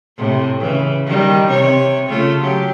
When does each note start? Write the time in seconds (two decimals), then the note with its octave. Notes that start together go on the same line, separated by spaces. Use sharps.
0.18 A2 C3
0.60 C#3 E3
1.06 D#3 G3
1.48 C3 C#5
2.09 C#3 A3 F4
2.41 F#3 G4